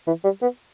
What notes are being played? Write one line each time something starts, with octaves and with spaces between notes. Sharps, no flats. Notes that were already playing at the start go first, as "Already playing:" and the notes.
E3
G3
B3